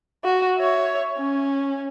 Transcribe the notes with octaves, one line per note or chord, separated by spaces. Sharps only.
F#4
C#5 E5
C#4